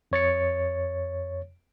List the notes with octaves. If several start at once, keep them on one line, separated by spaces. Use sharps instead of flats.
F2 C#5 A6 C#7